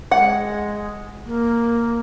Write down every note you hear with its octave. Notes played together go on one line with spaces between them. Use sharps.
G#3 F#5
A#3